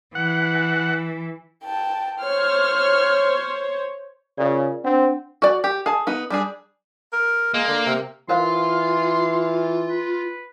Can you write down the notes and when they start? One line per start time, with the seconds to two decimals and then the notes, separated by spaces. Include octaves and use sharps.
0.15 E3 F#5
1.64 G5 A5
2.20 C5 C#5 F6
4.38 C#3 F4 A#4 D5
4.85 C4 D4 C5 F#5
5.42 F#4 D5
5.64 G4
5.86 G#4 A5
6.07 B3 D#4
6.30 G3 D4 G#4
7.13 A#4
7.54 G#3 A#3
7.68 D3
7.86 C3
8.29 E3 F4 A#4 C5 F5 C6
9.90 B4